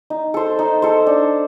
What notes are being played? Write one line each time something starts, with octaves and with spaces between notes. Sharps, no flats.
D#4
A4 C5
D#4
A4 C5
D4